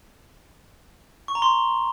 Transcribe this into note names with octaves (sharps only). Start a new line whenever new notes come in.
C#6
A#5
C6